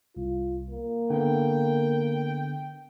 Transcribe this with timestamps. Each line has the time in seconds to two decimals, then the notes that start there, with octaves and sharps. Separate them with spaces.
0.17 C2 F4
0.70 A#3
1.10 D3 B3 G5